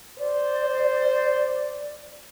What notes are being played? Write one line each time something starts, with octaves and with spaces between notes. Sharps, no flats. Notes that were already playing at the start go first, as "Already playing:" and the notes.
C5 D5